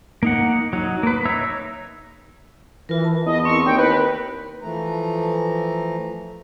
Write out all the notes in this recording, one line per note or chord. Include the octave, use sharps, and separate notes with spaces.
A#3 D#4 F#5
F#3 D#4
A#3 B4
D#4 C#5 E5 A#5 E6
E3 F4 A#4
A5
E2 D#5
C4 E4 A#4 C#6
D#2 G5
A#4 B4
E3 F3 A3 A#5